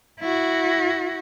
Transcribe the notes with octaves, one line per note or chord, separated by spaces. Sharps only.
E4 F#4